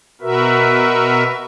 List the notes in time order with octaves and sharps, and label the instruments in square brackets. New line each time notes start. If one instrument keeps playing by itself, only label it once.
[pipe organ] B2 F#4 A#4 B4 E5